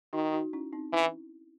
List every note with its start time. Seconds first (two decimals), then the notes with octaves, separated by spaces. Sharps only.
0.13 D#3 D#4 F#4
0.32 D#4 F#4
0.53 C#4 E4
0.73 C4 D#4
0.93 E3 C#4 E4